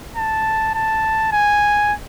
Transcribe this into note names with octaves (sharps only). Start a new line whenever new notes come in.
A5
A5
G#5